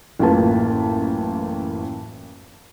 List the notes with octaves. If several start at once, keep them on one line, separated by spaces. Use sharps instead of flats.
A1 F#2 A#3 F4 B4 A5